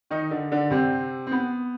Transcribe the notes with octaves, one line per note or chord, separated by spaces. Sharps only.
D#3 D#4
D3 D4
D3 D4
C3 C4
C4
B3